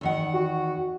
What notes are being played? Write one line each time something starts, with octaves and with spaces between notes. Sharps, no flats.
E2 D#3 F#5
F#4